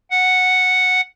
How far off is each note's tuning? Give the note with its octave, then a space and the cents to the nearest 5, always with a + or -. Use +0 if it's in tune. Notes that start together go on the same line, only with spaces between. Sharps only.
F#5 -5